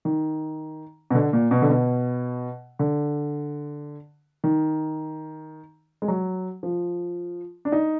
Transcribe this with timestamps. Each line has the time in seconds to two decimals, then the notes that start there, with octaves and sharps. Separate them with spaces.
0.05 D#3
1.10 B2
1.15 D3
1.33 A#2
1.51 B2
1.62 D3
1.70 B2
2.79 D3
4.44 D#3
6.02 G#3
6.08 F#3
6.63 F3
7.65 D4
7.72 D#4